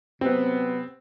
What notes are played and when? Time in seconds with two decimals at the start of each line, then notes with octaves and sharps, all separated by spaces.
0.21 C3 F#3 B3 C4